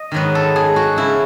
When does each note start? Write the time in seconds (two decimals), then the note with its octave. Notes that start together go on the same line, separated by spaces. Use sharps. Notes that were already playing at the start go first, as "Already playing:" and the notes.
Already playing: D#5
0.12 G#2 D#3 F#3 B3 B4
0.35 A4
0.56 G#4
0.76 F#4
0.96 C#3 F#3 C#4 E4